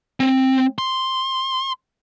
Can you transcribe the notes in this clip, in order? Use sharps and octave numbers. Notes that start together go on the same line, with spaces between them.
C4
C6